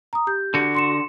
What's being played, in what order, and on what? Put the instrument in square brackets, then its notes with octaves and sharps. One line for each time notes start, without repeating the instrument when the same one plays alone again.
[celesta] A#5 D#6
G4 G6
[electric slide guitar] D3 F#4
[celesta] C6 C#7 E7